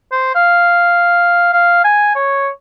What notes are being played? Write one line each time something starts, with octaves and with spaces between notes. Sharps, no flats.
C5
F5
F5
G#5
C#5